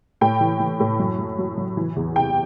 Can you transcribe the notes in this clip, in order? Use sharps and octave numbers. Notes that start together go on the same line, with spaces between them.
A2 G5
E3
E3
A2
F#2
F#3
F#3
F#2
E3
E2
C3 G5